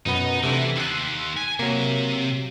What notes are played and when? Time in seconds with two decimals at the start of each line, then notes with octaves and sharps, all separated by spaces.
0.06 F#2 B2 B3 D#4
0.43 C3 E3 A3 D4
0.76 D#2 C6 E6 F#6
1.37 G#5
1.59 C3 F#3 A#3